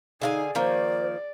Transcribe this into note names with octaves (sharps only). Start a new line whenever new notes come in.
D3 D#4 G#4 F5 G#5
D#3 F3 A#3 C5 D5